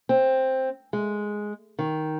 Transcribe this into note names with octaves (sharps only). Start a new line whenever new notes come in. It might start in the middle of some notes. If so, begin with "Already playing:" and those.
C4
G#3
D#3